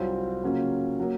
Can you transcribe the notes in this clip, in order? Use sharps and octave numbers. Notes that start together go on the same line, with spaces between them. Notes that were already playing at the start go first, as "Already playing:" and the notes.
Already playing: C2 C3 F#3 C4 F4
C#3 F#3 A#3 C#4 F4
F#3 A#3